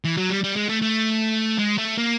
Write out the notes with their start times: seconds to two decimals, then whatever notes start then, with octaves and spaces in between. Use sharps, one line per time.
0.05 E3
0.17 F#3
0.30 G3
0.44 G3
0.56 G#3
0.69 A3
0.82 A3
1.59 G#3
1.78 A3
1.98 A#3